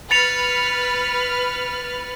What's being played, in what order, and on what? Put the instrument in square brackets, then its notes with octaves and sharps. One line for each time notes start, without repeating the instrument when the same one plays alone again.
[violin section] B4 F6 [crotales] A6 C#7 F7